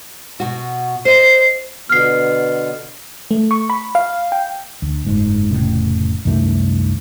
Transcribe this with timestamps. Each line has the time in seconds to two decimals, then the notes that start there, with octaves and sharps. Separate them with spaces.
0.40 B2 F#4
1.05 C5 D#5 C7
1.90 B2 D3 B3 F6 C7
3.31 A3
3.51 C#6
3.70 B5
3.95 F5
4.32 G5
4.82 D2
5.05 F#1 G#2
5.50 F1 A2 C#3
6.25 C2 F#2 D#3 A3